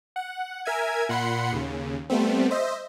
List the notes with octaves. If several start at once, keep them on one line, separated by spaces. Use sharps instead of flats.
F#5
A#4 E5 G#5 G#6
A#2 F#5 B5 C6 C#7
D#2 C#3
G3 A3 B3 C4
C5 D#5 E5